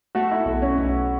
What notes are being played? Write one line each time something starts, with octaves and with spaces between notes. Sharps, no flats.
A3 F#4
E4
B1
C#4
B1